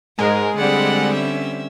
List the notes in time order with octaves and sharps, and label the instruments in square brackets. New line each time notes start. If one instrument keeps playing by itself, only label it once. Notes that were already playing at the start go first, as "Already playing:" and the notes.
[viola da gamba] G#2 [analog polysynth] G#3 [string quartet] A#4
[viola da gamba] D3 G3 C4 [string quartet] D5 F#5 B5
[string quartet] C#4 E5